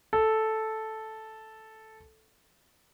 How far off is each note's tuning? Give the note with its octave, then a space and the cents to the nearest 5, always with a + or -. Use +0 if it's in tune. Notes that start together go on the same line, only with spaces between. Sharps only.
A4 -5